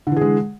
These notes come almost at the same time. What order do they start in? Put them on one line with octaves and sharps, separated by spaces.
D3 E3 G#4 G#3